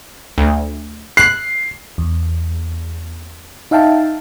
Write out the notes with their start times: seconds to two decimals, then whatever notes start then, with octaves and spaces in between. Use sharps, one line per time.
0.38 D2
1.17 F#6 C7
1.98 E2
3.71 D#4 E5 F5 G5 A5